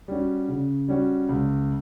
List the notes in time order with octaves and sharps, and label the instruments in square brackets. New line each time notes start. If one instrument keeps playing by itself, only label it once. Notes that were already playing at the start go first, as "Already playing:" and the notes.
[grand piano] G3 C#4 F#4
C#3
G3 C#4 F#4
C#2